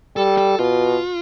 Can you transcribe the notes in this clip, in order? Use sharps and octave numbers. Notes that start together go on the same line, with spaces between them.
G3 A4
A4
B2 F4